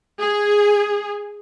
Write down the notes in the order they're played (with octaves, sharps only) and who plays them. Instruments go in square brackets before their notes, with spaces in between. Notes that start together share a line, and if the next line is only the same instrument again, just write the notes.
[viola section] G#4